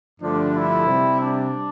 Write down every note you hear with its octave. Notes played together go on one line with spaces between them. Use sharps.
G2 D3 F3 A3 D4
E4
C3 G3
D4